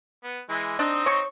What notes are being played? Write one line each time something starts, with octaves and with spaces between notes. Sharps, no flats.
B3
E3 G#3
C4 D4 D#4 D#5
C#5 C#6